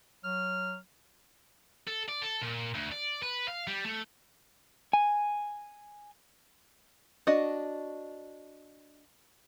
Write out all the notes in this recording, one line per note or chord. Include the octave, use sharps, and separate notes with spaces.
F#3 F6
A4
D5
A4
A#2
D2
D5
B4
F5
G3
A3
G#5
D4 F#4 D#5